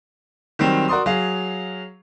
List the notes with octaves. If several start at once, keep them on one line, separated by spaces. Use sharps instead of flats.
D#3 F#3 G3 C4
F#4 A#4 D5 C6 D#6
F#3 G#4 F5